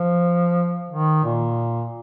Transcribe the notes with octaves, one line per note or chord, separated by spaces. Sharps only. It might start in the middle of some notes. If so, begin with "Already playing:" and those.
Already playing: F3
D#3
A#2